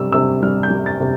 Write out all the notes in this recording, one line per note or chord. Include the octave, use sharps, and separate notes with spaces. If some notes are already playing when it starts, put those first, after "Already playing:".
Already playing: C3 G3 E6
C3 E6
G3 F6
G6
G3
A6
C3